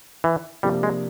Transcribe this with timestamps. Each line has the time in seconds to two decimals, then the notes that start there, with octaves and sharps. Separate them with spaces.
0.24 E3
0.63 C3 F3 G3 A#3 D4 G4
0.83 G#3